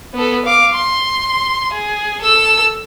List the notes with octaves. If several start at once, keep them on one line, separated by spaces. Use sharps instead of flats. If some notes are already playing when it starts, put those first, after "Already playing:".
B3 A4
F5 D6
C6
G#4
A4 E6